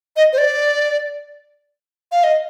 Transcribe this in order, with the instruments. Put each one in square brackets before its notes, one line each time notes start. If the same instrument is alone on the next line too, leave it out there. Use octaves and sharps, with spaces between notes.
[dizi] D#5
C5
D5
F5
D#5